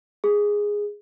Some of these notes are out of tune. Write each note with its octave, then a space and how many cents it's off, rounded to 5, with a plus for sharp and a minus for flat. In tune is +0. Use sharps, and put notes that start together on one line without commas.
G#4 -5